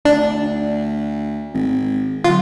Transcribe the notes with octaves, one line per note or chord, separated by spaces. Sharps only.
D2 D4 D5
G#1
D3 F#3 F4